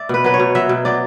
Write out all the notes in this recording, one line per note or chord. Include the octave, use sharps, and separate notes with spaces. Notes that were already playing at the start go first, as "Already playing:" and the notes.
Already playing: D5 E5
B2 B4
F#3 B4
C#5
B2
F#3 E5
B2
F#3 D5